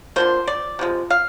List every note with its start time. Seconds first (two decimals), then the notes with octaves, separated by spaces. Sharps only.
0.16 D3 F3 A#3 C5
0.48 D5
0.79 C3 F3 G#3
1.10 F5